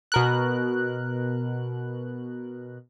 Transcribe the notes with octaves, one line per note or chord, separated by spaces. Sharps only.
B2 A#4 F#6